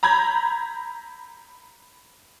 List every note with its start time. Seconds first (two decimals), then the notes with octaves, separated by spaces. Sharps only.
0.03 A#5 B5 G6 G#6